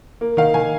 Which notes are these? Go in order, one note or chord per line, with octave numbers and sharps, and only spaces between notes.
A#3
D#3 F5
D#3 G#5